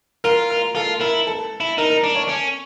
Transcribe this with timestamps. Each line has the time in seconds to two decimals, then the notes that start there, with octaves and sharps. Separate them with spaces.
0.24 F4 A#4
0.50 A#4
0.75 F4 A4
1.01 E4 A#4
1.27 A4
1.61 E4
1.78 D#4 A#4
1.90 A#4
2.04 D4
2.15 C#5
2.29 C#4